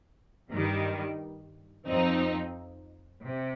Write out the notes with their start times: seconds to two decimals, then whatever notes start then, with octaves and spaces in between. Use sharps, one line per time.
0.52 G2 D#3 G3
1.88 F2 F3 C4 D#4
3.25 C3